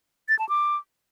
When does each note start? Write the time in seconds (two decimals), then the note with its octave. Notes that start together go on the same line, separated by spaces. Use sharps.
0.29 A6
0.39 A5
0.49 D6